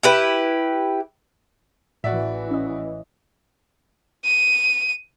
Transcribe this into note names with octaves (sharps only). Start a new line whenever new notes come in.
E4 G4 B4
A1 A2 E3 F#4 D5 E5
C#4 D#5
D#7